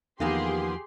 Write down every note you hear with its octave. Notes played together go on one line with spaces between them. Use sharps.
E2 D#3 F3 A#3 B3 G4 G#4 C6